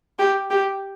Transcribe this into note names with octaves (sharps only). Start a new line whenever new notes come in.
G4
G4